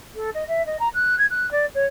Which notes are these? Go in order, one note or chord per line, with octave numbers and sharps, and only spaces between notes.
A4
D#5
E5
D#5
A#5
F#6
G#6
F#6
D5
C#5